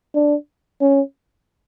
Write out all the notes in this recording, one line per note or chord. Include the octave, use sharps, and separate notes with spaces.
D4
C#4